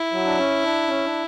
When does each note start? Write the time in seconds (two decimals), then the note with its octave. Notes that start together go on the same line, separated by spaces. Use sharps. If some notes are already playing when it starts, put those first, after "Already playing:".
Already playing: E4
0.12 F#3
0.25 D4
0.37 C#4
0.63 D4
0.88 C#4
1.05 D4